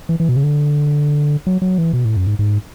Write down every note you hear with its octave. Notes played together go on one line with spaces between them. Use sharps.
E3
E3
B2
C#3
D3
F#3
F#3
E3
B2
A2
F#2
G#2
G#2